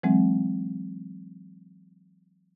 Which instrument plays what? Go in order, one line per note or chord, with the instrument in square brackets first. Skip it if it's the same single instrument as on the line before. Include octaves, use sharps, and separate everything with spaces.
[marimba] E3 F#3 G#3 C4